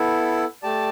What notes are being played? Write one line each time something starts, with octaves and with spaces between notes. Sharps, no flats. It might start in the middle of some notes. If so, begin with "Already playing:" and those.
Already playing: B3 E4 A4
A3 G4 D5 A5